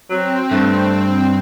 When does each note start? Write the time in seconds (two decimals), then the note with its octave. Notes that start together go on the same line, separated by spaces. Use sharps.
0.10 F#3 C4
0.51 G2 A3